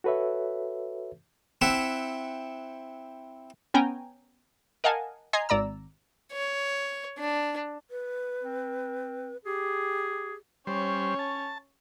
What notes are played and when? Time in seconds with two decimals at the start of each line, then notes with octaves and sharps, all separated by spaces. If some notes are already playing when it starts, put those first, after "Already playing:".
0.04 F#4 A4 B4 C#5 E5
1.61 C4 E4 E5 F#5
3.74 B3 C#4 G5 G#5 A#5
4.84 A#4 D#5 F5 F#5 G#5 A5
5.33 D#5 G#5 A#5 C6 G#6 C7
5.49 G#1 D5 A#5 E6
6.32 C#5
7.18 D4
7.91 B4
8.43 C4
9.45 G4 G#4
10.67 G3 C#4 C5 C#5
11.19 A5